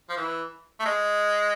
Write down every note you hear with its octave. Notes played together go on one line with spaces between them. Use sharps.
F3
E3
A3
G#3